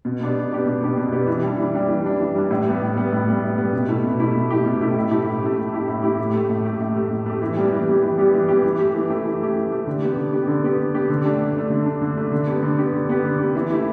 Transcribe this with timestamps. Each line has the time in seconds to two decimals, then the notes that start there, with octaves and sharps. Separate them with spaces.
0.05 B2
0.21 B3 D4 G4
0.36 B2
0.51 B3 D4 G4
0.66 B2
0.81 B3 D4 G4
0.97 B2
1.12 B3 D4 G4
1.27 E3
1.43 G3 D4
1.58 E3
1.74 G3 D4
1.89 E3
2.05 G3 D4
2.20 E3
2.35 G3 D4
2.51 A2
2.66 G3 B3
2.82 A2
2.97 G3 B3
3.12 A2
3.28 G3 B3
3.43 A2
3.58 G3 B3
3.73 B2
3.88 A3 E4 G4
4.03 B2
4.20 A3 E4 G4
4.34 B2
4.50 A3 E4 G4
4.66 B2
4.81 A3 E4 G4
4.97 A2
5.11 A3 E4 G4
5.26 A2
5.42 A3 E4 G4
5.58 A2
5.72 A3 E4 G4
5.88 A2
6.03 A3 E4 G4
6.19 A2
6.33 A3 G4
6.49 A2
6.65 A3 G4
6.80 A2
6.95 A3 G4
7.11 A2
7.26 A3 G4
7.42 E3
7.57 G3 B3 G4
7.73 E3
7.87 G3 B3 G4
8.03 E3
8.18 G3 B3 G4
8.34 E3
8.49 G3 B3 G4
8.64 E3
8.79 A3 G4
8.95 E3
9.10 A3 G4
9.25 E3
9.41 A3 G4
9.56 E3
9.72 A3 G4
9.87 D3
10.02 B3 G4
10.17 D3
10.33 B3 G4
10.48 D3
10.64 B3 G4
10.78 D3
10.94 B3 G4
11.10 D3
11.25 A3 D4
11.41 D3
11.56 A3 D4
11.70 D3
11.86 A3 D4
12.02 D3
12.17 A3 D4
12.32 D3
12.47 B3 G4
12.63 D3
12.79 B3 G4
12.93 D3
13.09 B3 G4
13.24 D3
13.39 B3 G4
13.55 E3
13.71 A3 E4 G4